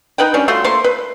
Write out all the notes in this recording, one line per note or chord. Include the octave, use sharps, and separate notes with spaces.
D#4 B4 F#5 G5
G3 C#4 D4
A3 F4 F#4 C6
A3 A#3 C5 C6
B4